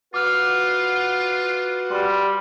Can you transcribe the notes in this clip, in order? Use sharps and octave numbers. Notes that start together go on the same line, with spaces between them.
F4 F#4 B4 F#5 D6 F6 F7
G3 C6